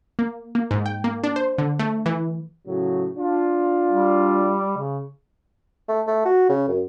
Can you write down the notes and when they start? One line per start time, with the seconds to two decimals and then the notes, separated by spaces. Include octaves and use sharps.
0.19 A#3
0.55 A#3
0.71 G#2
0.86 G5
1.04 A#3
1.24 D4
1.36 C5
1.58 D3
1.79 A3
2.06 E3
2.67 A2 C#3 F#3
3.17 D4 F4
3.91 G3
4.77 C#3
5.89 A3
6.07 A3
6.25 F#4
6.49 C#3
6.68 F#2